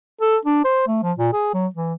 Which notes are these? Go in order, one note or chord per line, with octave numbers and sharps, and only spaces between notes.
A4
D4
C5
A3
F3
A#2
G#4
F#3
E3